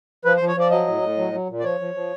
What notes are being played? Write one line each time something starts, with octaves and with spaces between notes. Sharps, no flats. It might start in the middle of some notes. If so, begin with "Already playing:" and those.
F3 B4
C5
F3
C#5
F3 D5
F#3 D#5
A2
A2
F#3
F#3
A#2
D5
F3 C#5
F3
F3